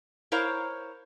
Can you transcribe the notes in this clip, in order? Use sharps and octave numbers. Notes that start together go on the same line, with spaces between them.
E4 A#4 C5 C#5 F5 A#5